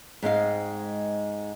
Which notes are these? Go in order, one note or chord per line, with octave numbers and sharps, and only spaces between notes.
G#2 G#3 C4 F5